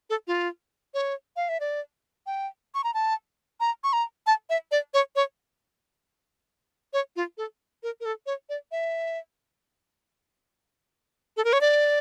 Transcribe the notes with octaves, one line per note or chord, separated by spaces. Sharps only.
A4
F4
C#5
F5
E5
D5
G5
C#6
A#5
A5
A#5
C#6
A#5
A5
E5
D5
C#5
C#5
C#5
F4
A4
A#4
A#4
A4
C#5
D5
E5
A4
A#4
C#5
D5